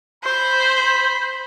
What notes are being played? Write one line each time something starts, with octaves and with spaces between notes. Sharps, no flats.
C5 B5